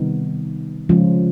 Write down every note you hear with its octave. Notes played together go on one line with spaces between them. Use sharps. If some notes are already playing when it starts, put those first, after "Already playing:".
Already playing: C3 D#3 G3 B3 D#4
C#3 F3 G#3 C#4 F4